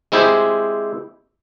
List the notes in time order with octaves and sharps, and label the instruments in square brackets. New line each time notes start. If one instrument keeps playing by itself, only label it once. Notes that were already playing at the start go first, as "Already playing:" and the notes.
[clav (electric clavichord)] G#3 C4 E4 G4 G#4 C5